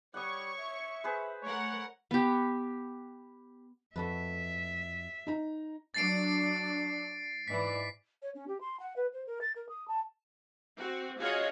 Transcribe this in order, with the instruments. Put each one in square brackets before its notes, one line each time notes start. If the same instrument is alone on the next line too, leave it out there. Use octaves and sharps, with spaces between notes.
[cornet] G3 [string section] C#5 C#6 [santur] F#5 D#6
[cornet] E5
[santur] G#4 B4 C5
[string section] A3 A#4 F#5 [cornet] C#5
[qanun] B3 G4
[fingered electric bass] F2 [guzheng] F#4 A4 B4 [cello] E5
[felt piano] D#4 A#5
[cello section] F#3 D4 [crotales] A6 C7 D7
[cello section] G#2 E3 D5 [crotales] B6
[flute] C#5
C#4
G4
C6
F#5
B4
C5
A#4
A6
A#4
D#6
A5
[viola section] C4 F#4
C#4 F4 F#4 G#4 C#5 D#5